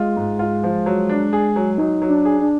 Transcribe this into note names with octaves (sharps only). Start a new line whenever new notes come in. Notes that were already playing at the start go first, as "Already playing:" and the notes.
Already playing: G#3 F4
G#2
F4
F3
F#3
D4
G#4
F#3
F#3 D#4
F#3
D4
G#4
D4